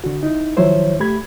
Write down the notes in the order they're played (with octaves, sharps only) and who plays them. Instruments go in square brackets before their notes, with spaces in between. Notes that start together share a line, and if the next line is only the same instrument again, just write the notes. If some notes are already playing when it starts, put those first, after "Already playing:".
[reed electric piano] D3 F#4
D#4 E4
D#3 F3 F#3 E4 C5 C#5
A3 G4 B5 G#6